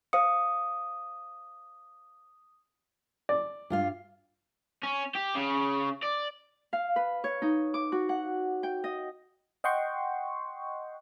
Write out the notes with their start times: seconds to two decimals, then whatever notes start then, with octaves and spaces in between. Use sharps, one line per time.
0.13 C5 F5 D#6 C#7
3.29 D5
3.70 G2 F4 F5
4.84 C#4
5.15 G4
5.35 C#3
6.03 D5
6.73 F5
6.96 B4
7.24 C#5
7.42 D#4
7.74 D6
7.92 F#4
8.09 F#5
8.63 G5
8.84 D#5
9.64 D#5 F#5 G5 C6 C#6